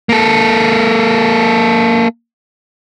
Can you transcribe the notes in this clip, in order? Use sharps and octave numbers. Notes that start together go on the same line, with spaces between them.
A#3 A4